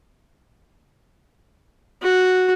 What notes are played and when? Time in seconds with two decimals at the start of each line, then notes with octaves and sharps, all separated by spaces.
2.02 F#4